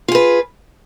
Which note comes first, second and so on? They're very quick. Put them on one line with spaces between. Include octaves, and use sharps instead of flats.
F4 G#4 B4